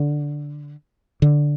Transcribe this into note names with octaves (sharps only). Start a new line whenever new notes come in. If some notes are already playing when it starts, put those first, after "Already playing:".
Already playing: D3
D3